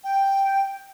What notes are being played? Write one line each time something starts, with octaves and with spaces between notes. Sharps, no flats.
G5